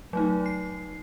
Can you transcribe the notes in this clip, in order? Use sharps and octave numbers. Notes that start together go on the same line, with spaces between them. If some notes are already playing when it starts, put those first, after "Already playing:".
F#3 A3 D#4
C7